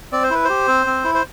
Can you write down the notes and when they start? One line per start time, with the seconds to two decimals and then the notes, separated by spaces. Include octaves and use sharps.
0.12 C4 D5
0.23 C5
0.30 E4 B4
0.45 G4 C5
0.68 C4
0.86 C4
1.04 E4
1.15 C5